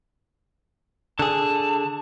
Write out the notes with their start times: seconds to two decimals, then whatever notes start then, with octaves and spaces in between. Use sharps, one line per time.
1.19 D3 G#4 A5